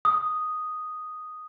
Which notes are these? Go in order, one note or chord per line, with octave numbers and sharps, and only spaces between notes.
D#6